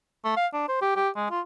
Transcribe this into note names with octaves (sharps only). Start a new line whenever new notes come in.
A3
F5
D4
C5
G4
G4
G#3
F4